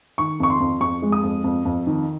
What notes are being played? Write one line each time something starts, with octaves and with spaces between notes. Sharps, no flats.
D#3 C#6
F2 C#6
C6
F2
F2 C#6
G#3
D#6
F2
F2
F2
D#3